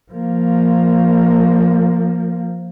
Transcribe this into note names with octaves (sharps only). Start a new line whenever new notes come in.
F3 A#3